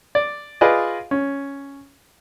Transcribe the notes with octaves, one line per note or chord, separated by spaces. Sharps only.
D5
F4 G#4 B4 D5 D#5
C#4